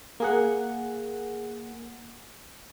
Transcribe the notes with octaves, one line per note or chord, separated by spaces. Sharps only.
A#3 G#4 F#5